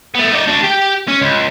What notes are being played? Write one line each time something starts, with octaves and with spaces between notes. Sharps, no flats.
A3 B3
D#4 D5
D4 F#4
G4 G5
C#4
C#2